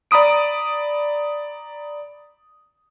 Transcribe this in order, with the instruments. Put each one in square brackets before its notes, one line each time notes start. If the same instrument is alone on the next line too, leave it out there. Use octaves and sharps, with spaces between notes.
[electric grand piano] D5 A#5 B5 D#6 D7